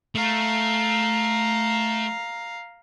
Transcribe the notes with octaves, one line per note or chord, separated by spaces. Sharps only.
A3 F5 A#5